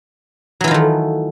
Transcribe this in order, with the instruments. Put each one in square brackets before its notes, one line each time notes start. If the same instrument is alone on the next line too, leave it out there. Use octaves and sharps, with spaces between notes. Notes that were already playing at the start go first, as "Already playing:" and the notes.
[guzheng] F#3
E3
F4
D#3
A3